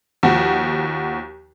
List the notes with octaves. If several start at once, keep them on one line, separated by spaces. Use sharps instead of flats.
D#2 F3 F#4